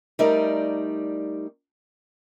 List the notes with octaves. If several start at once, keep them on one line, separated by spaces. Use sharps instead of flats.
G3 A3 D#4 A#4 D5